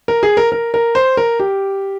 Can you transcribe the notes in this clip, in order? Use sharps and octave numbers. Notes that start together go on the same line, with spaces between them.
A#4
G#4
A#4
A#4
A#4
C5
A#4
G4